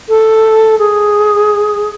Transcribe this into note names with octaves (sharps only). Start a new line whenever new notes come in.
A4
G#4